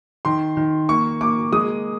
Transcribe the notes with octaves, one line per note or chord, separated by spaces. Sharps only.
D#3 C6
D#3
A#3 C#6
A#3 D6
G#3 D#6